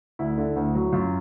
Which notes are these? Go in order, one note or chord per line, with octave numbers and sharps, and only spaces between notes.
D2 E4
D3
D2
F#3
F#2 F4